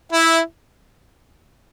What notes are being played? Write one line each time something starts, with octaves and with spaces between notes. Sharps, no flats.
E4 E5